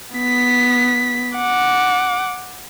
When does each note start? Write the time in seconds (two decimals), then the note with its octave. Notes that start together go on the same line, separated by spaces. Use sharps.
0.16 B3 B6
1.37 F#5 D6